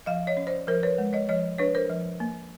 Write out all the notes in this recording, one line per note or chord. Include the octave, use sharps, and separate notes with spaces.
F3 D#5 F5
C#5 D#5
C#4
C5 D5
F3 A#4 C5
B4 C#5
G#3
C#5 D#5
F3 C#5 D#5
D4 B4 C#5
A#4 C5
F3
A#3